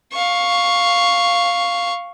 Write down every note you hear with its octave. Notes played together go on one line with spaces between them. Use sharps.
F5 C#6